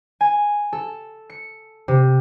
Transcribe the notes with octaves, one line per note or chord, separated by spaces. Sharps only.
G#5
A4
C#7
C3